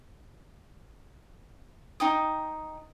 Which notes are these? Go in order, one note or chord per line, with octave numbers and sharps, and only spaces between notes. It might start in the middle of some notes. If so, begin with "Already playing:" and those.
D#4 G5 D#6